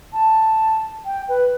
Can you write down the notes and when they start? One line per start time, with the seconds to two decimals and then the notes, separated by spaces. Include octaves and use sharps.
0.13 A5
1.05 G5
1.29 B4